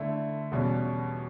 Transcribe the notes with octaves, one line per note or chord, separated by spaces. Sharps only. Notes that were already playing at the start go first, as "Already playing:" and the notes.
Already playing: D3 A3 E4
E2 B2 G3 C#4